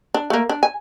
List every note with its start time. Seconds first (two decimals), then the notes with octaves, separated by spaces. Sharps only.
0.14 D4
0.30 A3 A#3
0.49 D4
0.63 G#5